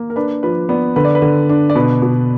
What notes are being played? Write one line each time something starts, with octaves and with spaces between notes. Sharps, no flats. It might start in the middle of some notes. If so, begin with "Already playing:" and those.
Already playing: A#3
A#4
D4 B4
F3 B4
B3 D5
D3 B4
D5
B4
D3
D4
D5
B2 B4
B2